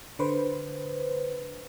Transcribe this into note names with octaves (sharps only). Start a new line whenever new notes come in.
D3 B4 C5